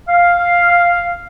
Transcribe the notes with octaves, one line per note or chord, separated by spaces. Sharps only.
F5